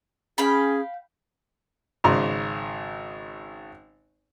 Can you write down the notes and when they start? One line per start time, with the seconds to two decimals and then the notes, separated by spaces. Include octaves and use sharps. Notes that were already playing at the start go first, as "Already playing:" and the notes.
0.38 C#4 G#4 F5 G5 B5
2.04 G#1 C#3 D5 A#5 C6